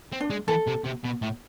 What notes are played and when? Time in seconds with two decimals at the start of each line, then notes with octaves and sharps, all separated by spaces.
0.12 C4
0.20 D4
0.30 G#3
0.48 E3 A4
0.67 C3
0.84 C3
1.04 B2
1.22 A2